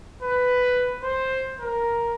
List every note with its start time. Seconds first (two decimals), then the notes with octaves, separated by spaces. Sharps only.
0.22 B4
1.03 C5
1.60 A#4